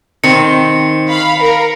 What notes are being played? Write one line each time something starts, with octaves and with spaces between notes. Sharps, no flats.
D#3 C4 C#7
F5 B5
A#4